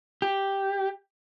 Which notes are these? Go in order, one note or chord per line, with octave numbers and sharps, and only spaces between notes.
G4